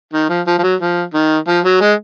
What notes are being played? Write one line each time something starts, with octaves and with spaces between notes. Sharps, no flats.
D#3
F3
F3
F3
F#3
F3
D#3
F3
F#3
G#3